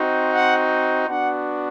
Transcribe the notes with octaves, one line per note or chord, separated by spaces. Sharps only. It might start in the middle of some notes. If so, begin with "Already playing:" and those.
Already playing: C4 D#4 F#4
F#5
B3 D4 F#4 F#5